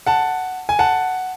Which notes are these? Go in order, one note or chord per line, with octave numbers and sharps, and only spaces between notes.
F#5 A5
G#5
F#5 A5